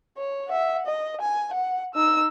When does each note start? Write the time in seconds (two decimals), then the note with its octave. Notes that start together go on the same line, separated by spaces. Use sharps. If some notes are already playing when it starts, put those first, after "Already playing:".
0.17 C#5
0.48 E5 F#5
0.87 D#5
1.21 G#5
1.54 F#5
1.94 D#4 E6